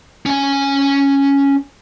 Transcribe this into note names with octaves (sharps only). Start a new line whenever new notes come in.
C#4 G#5